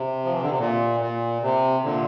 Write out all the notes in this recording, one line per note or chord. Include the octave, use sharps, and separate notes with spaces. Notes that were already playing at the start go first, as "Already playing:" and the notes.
Already playing: C3
F3
E3
D3
C3
A#2
A#2
C3
A#2 D3